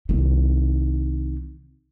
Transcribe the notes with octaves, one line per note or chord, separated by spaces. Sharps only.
C2 D#3